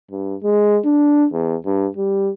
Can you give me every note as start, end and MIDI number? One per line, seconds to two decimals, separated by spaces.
0.11 0.35 43
0.43 0.78 56
0.85 1.25 62
1.33 1.55 40
1.65 1.87 43
1.97 2.30 55